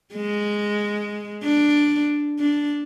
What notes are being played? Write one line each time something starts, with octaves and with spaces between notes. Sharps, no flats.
G#3
D4
D4